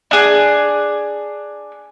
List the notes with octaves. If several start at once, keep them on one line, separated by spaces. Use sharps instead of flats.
D4 G#4